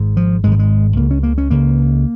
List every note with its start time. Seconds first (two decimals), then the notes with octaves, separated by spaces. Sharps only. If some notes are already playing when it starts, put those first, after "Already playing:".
Already playing: G#1 G#2
0.17 F3
0.43 G#1 G#2 G#3
0.52 F3
0.59 G#3
0.97 C#2 C#3 A#3
1.11 C#4
1.23 A#3
1.38 C#4
1.50 C#2 C#3 A#3